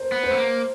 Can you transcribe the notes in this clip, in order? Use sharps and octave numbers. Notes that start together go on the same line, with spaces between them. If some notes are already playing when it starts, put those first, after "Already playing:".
Already playing: A#4 C5
B3
C5
A3
A#3